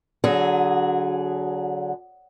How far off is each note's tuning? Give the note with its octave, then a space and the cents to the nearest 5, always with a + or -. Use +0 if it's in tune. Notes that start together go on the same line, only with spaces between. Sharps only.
D3 -25 F#3 +0 G#4 +0